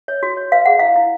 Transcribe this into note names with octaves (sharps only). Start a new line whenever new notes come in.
C#5
F#4
C#5
B4 F5
G#4 F#5
E4 F5
E4